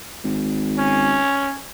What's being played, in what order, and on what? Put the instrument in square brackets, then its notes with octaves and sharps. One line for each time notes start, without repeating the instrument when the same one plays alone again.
[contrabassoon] G#1
[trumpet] C#4